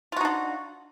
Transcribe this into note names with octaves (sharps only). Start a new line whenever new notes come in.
D4 D#4 F4 F#4